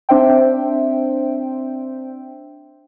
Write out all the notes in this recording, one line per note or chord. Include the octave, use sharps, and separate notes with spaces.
C4 D4 C5 E5 G5